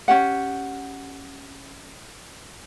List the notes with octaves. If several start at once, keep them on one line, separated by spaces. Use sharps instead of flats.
C#4 G4 F#5